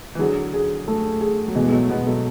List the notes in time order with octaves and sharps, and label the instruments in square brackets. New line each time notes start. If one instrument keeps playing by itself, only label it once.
[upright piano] E3
[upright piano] D3 F#3 [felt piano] G#4
[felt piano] G#4
A3
G#4
[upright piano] F#3
[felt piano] B2 [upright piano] E3 G#3
[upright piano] G#3
F#3 A3
[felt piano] B2 [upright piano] G#3 B3
[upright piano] F#3 A3